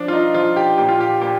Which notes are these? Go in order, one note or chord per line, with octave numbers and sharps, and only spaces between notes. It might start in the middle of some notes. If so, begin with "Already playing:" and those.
Already playing: F3 D4
F4
D#4
F3 F4
G4
A#2 G4
F4
G4
A#2 G4